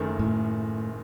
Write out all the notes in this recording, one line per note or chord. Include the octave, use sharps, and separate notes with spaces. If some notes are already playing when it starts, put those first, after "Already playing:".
Already playing: F#1 F#2 D#3 A3
A2